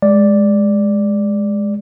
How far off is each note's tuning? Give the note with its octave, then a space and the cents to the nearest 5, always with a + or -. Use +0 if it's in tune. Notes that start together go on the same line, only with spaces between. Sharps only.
G#3 +0 D5 +0